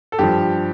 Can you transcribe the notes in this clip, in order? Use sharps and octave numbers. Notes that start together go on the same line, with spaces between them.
A4
G2 F3 G4